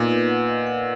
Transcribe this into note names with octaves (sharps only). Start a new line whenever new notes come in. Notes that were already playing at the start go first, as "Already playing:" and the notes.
Already playing: A#2 B3 D#4 B4 D#5
B4
F#5
D#5
F#5